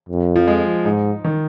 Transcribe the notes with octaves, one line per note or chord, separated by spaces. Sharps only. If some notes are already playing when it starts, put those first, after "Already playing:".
F2
F3
G#3
G#2 D#4
D#3